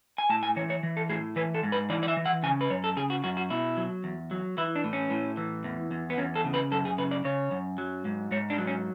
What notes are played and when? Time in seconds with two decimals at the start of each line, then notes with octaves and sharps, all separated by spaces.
0.18 G#5
0.30 A2 A5
0.43 G#5
0.56 E3 C#5
0.70 C#5
0.83 E3
0.97 A4
1.09 A2 G#4
1.36 E3 B4
1.54 A4
1.63 G#2
1.72 B4
1.90 E3 D5
2.03 D5
2.08 E5
2.17 E3
2.26 F#5
2.43 C#3 G#5
2.61 B4
2.70 F#2 C#5
2.84 A4
2.97 C#3 G#4
3.10 F#4
3.24 F#2 F#4
3.37 F#4
3.50 B2 E4
3.77 F#3
4.04 E2
4.31 F#3
4.58 E3 E4
4.75 D4
4.84 A2
4.93 C#4
5.10 A2
5.37 E3
5.64 E2
5.91 E2
6.10 B3
6.18 E2 C#4
6.36 A4
6.44 C#3
6.54 B4
6.71 F#2 A4
6.85 G#4
6.98 C#3 B4
7.11 D5
7.25 C#3 C#5
7.51 F#2
7.78 F#3
8.05 G#2
8.31 G#2 C#5
8.50 D4
8.58 F#3
8.67 C#4